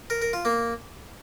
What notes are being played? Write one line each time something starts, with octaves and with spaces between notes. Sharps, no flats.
A#4
A#4
F4
A#3